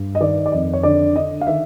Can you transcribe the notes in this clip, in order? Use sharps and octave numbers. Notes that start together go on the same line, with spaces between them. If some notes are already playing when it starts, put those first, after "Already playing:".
Already playing: G2
D#5
D#3 D5
D5
F2 D#5
C#5
D3 D5
D3 D#5
F5
D#3 E5